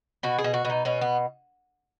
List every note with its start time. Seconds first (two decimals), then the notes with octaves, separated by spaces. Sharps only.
0.23 B2 F#4
0.38 G#4
0.44 B2
0.54 F#4
0.65 B2 D#4
0.85 B2 C#4
1.01 B3